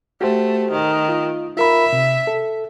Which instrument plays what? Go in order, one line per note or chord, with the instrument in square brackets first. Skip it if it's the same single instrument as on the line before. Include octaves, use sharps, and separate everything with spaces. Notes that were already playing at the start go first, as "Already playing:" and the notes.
[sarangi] A3 [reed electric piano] F#4 G4 C5
[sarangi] D#3
[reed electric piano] F4
[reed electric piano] F4 A#4 B5 [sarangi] E5
[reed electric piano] C3
A4